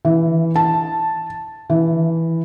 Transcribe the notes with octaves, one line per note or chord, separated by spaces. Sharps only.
E3
A5
E3